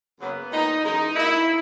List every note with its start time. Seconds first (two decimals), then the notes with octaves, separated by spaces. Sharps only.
0.20 F#2 C#3 F#3 A#3 B3
0.52 A#2 G#3 D#4
0.84 F#2 E3 G#3 D#4
1.16 B2 A#3 E4